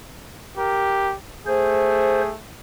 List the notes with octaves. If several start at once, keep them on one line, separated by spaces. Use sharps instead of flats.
G4 A#4
A3 G#4 C5